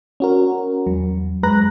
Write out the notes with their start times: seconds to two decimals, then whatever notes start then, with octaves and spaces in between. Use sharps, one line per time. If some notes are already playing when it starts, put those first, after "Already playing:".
0.20 C#4 F#4 A#4
0.86 E2 F#3
1.43 F#2 G#3 B4 A#5 F#6 A#6